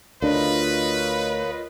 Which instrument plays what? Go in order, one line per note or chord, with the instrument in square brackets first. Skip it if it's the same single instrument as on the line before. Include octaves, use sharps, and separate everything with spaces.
[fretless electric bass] D2 D4 [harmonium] F4 D#5 [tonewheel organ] A#4 C#5 F5 [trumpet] B4